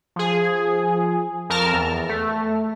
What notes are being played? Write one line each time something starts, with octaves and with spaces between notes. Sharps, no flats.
F3 G#4
F2 A#4 A5 F6
E2
A3